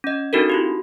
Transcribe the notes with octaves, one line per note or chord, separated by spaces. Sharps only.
C#4 D#5
C4 D4 D#4 F#4 A4 A#4
E4 F#4 G4